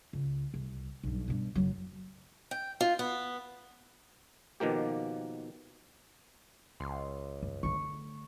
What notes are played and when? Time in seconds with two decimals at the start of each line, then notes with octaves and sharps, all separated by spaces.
0.13 C#2
0.54 C2
1.03 B1 G2
1.28 G2 B2
1.55 F#1 F#3
2.51 G5
2.81 F4
2.99 B3
4.60 B2 D#3 F3 A#3 G4
6.80 C#2 C6
7.43 F#2
7.63 D3 A3 C#6